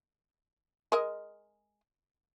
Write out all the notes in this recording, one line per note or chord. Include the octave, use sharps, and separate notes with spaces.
G#3 A#4 D#5